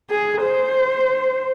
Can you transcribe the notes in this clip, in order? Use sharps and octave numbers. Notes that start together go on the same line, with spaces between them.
G#4
C5